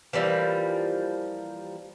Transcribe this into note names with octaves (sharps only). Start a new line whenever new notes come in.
E3 F3 G3 A#3